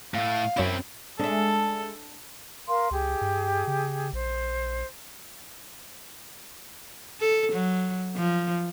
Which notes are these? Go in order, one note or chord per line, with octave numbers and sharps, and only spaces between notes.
A2 A3 F5
F#2 C4 E4 C#5 E7
G#3 D4 A4 E5
A#4 F5 C6
C#2 G4 G#4
G2
C#3
A#1 C5
A4
F#3
F3